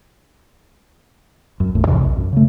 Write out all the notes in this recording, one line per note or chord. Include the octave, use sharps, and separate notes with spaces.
F#2
F#1 D#2 A2
E2 G#2 C3 E3
B1
F#2
C#3 A3